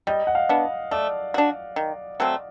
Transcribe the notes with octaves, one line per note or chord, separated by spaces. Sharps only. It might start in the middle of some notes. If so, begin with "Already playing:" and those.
G3 D#5
F#5
F5
B3 D4
A3 D5
D4 F#4
D#3
F#3 A3 C4